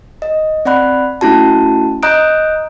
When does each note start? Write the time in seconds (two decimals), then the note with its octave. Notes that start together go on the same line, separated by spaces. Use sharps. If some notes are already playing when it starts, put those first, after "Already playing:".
0.22 D#5
0.65 C4 D5 F#5 B5 F#6
1.21 A3 C#4 E4 F#4 A5
2.03 D#5 A#5 D#6 F#6 G6 D7